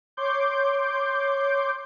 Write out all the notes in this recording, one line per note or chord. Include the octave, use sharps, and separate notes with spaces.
C#5 C6 D6 G6